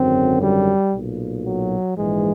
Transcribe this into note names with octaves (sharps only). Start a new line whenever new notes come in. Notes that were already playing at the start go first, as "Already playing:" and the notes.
Already playing: G#1 F#2 D3 C4
G3
B1 A#2
F#3
A#1 G#2 E3 G#3